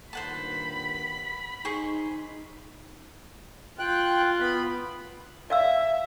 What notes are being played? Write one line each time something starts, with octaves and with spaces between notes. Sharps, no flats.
G2 A#2 D#3 C5 F#5 A5 B5
D#4 G#4 C5 C#6
F4 G5 F#6
B3 B5
D5 E5 F5 E6